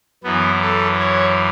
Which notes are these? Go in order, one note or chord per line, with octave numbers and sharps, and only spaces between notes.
F#2 E3 B3
A4
C#5